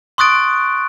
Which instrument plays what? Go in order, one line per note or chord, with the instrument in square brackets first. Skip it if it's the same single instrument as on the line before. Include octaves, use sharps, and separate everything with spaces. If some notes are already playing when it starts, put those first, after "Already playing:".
[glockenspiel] C6 C#6 D#6 F#6 A6 D7